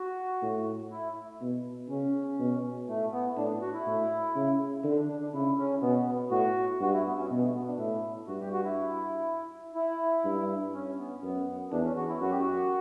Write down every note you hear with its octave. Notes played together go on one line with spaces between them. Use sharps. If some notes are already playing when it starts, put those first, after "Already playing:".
Already playing: F#4
A2
E4
B2
C#3 C#4
B2
A2 A3
B3
A2 D4
F#4
E4
A2
C#3
D3
D4
D4
D4
C#3 E4
C#4
B2 B3
B3
A2 F#4
G2 F#4
E4
B3
C#4
B2 B3
A3
B3
D4
A2 E4
G2 F#4
G4
F#4
E4
E4
G2
C#4
B3
F#2 B3
E2 D4
C#4
F#4
E4
F#2 F#4
G4
F#4